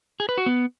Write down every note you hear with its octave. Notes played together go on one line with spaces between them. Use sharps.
G#4
B4
F#4
B3